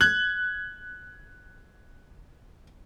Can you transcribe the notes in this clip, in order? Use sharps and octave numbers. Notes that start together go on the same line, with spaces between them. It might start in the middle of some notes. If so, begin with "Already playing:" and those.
F#6 G#6 F#7